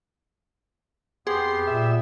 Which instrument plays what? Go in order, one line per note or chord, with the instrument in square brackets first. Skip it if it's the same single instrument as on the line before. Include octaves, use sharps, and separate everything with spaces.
[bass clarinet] F2 [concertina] B3 G4 [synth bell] G#4 [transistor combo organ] C6
[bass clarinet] A#2 [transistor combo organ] E5